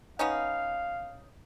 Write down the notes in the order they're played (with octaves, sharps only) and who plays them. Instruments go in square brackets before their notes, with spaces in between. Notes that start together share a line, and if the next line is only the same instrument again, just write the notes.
[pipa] B3 C#4 D#4 [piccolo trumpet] F5